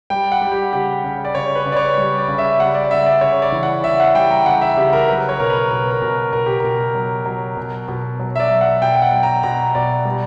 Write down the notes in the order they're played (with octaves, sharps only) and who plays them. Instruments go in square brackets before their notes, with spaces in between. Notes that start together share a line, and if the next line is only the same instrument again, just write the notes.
[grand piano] G3 G5
F#5
G3
G4
C#3 G4
C#3
D5
C#3 C#5
B4
C#3
D5
C#5
G3
D5
C#3
E5
G3 F#5
D5
D5
C#3 E5
D5
C#3 C#5
D5
E3
F#5
C#3 E5
F#5
G3 G5
A#5
C#3 F#5
E5
C#3 G4
A#4
F#3 B4
C#5
B2 A#4
B4
B2 A#4
A#4
B2
B2 A#4
G4
B2 A#4
F#3
F#3
B2
B2
F#3
E5
D5
F#3
F#5
B2 G5
G5
F#5
F#3
A#5
B2 A#5
B2 D5
G3